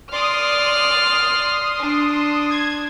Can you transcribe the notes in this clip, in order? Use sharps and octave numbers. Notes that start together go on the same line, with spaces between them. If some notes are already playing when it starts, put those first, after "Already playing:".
D5 C6 D#6 F6
D4
G#6